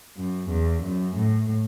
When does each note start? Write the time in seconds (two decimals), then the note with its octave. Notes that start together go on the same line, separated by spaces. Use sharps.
0.17 F#2
0.51 E2
0.84 F#2
1.17 A2